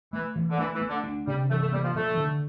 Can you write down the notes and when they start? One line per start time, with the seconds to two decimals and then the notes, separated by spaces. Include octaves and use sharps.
0.13 E3 A3
0.36 E3
0.49 D3
0.58 E3 A3
0.74 E3
0.81 A3
0.88 D3
1.04 D4
1.27 C3 G3
1.50 E3 A3
1.61 A3
1.72 G3 A#3
1.83 F3
1.95 F3 A3
2.17 D3